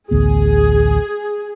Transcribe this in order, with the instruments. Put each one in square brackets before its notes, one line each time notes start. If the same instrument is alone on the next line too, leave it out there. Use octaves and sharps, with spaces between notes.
[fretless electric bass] A1 D2 B3 [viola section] G#4